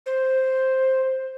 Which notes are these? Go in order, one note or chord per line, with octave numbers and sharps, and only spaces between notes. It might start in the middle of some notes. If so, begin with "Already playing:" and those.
C5